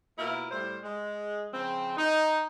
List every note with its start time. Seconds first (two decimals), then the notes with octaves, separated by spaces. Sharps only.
0.18 B2 A#3 E4 F4 A#4
0.51 A2 G3 C5
0.83 G#3
1.52 C#3 F3 C4
1.97 D#4